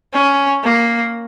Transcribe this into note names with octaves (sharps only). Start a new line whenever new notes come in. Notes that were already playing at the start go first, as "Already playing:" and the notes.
C#4
A#3